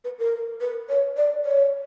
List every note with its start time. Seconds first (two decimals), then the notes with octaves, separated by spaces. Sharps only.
0.04 B4
0.19 A#4
0.61 B4
0.89 C#5
1.17 D5
1.45 C#5